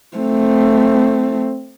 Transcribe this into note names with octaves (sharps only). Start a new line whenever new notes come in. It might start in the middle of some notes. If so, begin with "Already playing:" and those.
A3 C4